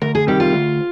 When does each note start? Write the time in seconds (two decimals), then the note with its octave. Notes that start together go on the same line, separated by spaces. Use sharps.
0.01 D2 A#4
0.15 G#4
0.27 C3 D#3 G3 G4
0.40 F4
0.53 D2